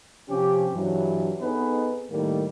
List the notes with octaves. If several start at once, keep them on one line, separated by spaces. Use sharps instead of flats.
C3 F3 C4 C#4 G4
G2 E3 F#3
B3 C4 D#4 G#4 A4 B4
A2 D#3 G3 A#3